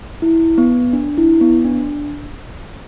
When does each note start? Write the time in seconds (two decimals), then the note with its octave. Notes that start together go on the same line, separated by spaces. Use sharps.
0.22 E4
0.58 B3
0.93 D4
1.18 E4
1.41 B3
1.65 D4